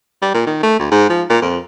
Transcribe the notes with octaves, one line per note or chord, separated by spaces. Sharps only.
G3
A#2
D#3
A3
D2
G#2
F3
A#2
F2